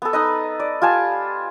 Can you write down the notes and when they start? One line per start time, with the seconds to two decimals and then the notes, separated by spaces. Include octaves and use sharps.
0.02 B3 A4
0.13 D#4 B4 D#5
0.60 D5
0.82 F4 G4 G#5 A5